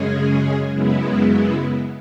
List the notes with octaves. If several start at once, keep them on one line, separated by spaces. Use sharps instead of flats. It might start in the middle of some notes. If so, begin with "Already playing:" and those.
Already playing: F#2 C#3 G#3 C#4 G#4
F#2 C#3 G#3 B3 E4